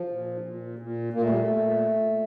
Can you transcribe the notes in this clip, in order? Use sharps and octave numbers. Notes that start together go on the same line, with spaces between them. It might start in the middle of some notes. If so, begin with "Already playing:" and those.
Already playing: F3
A#2
A#2
A#2
A#2 A#3
A3
G3
A3
A#2